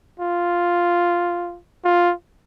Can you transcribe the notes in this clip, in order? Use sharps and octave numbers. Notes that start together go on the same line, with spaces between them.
F4
F4